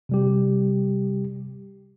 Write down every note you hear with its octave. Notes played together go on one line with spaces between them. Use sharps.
C3 G3 G4